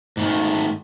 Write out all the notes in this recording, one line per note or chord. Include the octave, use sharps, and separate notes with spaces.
G#2 D#3 A3